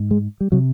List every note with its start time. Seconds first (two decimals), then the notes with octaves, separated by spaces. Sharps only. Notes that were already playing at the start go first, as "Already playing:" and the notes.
Already playing: G#2
0.11 G#3
0.41 G3
0.52 C3 F#3